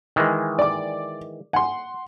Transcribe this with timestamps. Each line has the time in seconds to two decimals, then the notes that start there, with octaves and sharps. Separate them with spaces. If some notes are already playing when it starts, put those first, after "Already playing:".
0.16 D#3 E3 G#3
0.59 D5 D6
1.53 F#5 G#5 C6